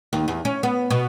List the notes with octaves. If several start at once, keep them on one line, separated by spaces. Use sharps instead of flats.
D#2
E2
C#4
B3
B2